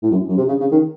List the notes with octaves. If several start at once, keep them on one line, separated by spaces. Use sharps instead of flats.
A2
F#2
F#2
C3
C#3
C#3
D#3